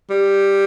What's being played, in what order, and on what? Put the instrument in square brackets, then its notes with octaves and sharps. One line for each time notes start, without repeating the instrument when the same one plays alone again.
[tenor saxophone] G3